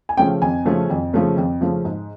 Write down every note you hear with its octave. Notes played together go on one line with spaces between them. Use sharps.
G#5
C#3 F3 A3 C#4 G5
F2 G#5
C#3 F3 A3 C#4
F2
C#3 F3 A3 C#4
F2
C#3 F3 A3 C#4
G#2